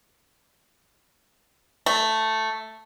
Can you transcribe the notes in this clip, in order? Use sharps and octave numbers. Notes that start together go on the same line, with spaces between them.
A3